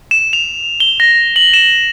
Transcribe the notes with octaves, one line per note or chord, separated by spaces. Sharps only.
E7
F7
G7
A#6
F#7
E7